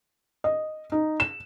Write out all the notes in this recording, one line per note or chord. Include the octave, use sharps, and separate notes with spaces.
D#5
D#4
E7